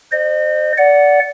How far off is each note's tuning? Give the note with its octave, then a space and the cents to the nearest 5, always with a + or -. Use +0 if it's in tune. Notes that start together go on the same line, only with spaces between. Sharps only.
C5 -5 D#5 -35
D5 -20 F#5 +0